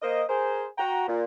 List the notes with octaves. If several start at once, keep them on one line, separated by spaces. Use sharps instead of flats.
A#3 A#4 C5 D#5
G#4 A#4 C5
F#4 G5 A#5
A#2